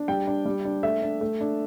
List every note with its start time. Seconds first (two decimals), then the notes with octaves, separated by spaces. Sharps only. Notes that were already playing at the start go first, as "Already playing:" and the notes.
Already playing: D4
0.08 G3 G5
0.27 D4
0.45 G3
0.65 D4
0.83 A3 E5
1.02 D4
1.21 A3
1.41 D4